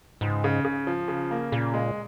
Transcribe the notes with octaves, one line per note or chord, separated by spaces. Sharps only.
C#2 G#2
C#3
C#3
F3
C#3
A#3
A#2 C#3
G#3